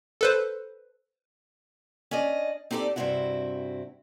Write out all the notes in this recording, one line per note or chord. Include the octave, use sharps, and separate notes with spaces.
A4 B4 C5
C#4 D4 D5 D#5
C4 D#4 G4 A4 D5
G2 C3 D#3 C4 E4 F#4